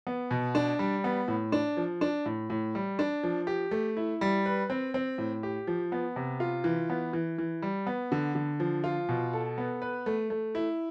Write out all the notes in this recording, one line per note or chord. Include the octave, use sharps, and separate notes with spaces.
B3
B2
D4
G3
B3
A2
D4
F3
D4
A2
A2
G3
D4
F3
G4
A3
E4
G3
B4
C4
C4
A2
G4
F3
B3
C3
F4
E3
B3
E3
E3
G3
B3
D3
D3
F3
F4
B2
A4
B3
B4
A3
A3
E4